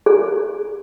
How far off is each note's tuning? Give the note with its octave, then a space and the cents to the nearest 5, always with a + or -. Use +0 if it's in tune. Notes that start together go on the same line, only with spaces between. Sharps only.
G#4 +45